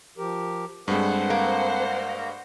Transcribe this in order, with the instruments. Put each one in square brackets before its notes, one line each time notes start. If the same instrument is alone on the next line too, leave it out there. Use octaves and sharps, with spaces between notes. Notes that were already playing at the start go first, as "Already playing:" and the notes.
[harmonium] F3 G4 A#4
[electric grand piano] G2 G#3 [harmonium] C4 A4 B4 [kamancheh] C5 F#5
[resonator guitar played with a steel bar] A#3